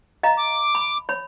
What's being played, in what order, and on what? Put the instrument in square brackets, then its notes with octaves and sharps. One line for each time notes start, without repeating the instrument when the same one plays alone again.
[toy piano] D#5 F5 A#5
[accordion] D6
[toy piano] B5
C#5 B5